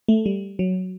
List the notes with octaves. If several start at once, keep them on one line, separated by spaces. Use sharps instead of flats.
A3
G3
F#3